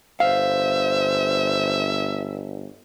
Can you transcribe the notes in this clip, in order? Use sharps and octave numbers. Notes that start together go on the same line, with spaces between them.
G1 C5 E5 F5